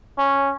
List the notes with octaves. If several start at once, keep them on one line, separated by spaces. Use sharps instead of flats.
C#4